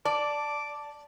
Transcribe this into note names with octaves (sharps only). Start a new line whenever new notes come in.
D5 A5 D6